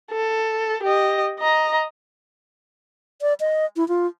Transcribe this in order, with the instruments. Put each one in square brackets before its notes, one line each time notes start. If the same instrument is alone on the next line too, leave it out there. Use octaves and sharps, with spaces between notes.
[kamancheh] A4
G4 D#5
D#5 A#5
[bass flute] D5
D#5
E4
F4